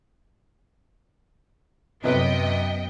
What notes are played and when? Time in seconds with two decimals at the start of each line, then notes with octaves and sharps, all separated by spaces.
2.04 F#2 C3 B3 B4 D#5 G5